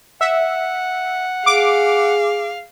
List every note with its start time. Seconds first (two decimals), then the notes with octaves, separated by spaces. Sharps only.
0.21 E5 F#5
1.46 G#4 F5 D6